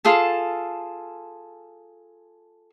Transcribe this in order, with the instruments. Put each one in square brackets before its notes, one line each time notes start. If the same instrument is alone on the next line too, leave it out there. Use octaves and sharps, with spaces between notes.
[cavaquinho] F4 G#4 A4 A5